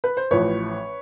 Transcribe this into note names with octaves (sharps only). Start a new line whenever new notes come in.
B4
C5
A1 A2 F3 B4 C#5